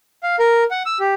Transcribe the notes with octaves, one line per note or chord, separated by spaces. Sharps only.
F5
A#4
F#5
E6
G4